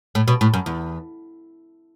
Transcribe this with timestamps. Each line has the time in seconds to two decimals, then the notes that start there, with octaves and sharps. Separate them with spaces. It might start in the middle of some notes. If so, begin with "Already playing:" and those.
0.15 A2
0.28 B2
0.41 A2
0.54 F#2
0.66 E2